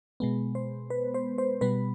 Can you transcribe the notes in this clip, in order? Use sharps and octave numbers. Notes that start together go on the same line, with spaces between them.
B2 G#3 B3
C5
B4
C5
C5
B2 G3 B3 B4